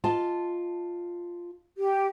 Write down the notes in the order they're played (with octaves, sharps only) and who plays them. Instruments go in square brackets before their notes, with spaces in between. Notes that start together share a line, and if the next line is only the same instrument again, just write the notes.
[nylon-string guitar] F4 D#5 A5
[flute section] G4